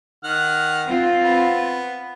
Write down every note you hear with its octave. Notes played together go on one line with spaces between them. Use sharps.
D#3 F#5 F6
C4 F4
B3